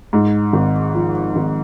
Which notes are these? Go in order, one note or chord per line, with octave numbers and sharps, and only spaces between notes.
G#2
G#1
F3
G#1